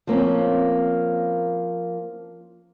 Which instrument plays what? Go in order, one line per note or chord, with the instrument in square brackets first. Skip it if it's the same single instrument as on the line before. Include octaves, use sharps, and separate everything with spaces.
[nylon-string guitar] F3 A#3 C4 C#4